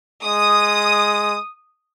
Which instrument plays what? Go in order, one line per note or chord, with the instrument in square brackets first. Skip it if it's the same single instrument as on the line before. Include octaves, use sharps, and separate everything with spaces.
[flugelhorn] G#3 [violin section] D#6